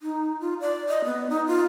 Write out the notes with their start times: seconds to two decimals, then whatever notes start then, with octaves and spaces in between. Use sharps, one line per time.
0.02 D#4
0.41 F4
0.60 D5
0.89 D#5
1.05 B3
1.30 D#4
1.47 F4